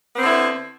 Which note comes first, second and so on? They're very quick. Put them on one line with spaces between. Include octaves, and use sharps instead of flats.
B3 C4 D3 E4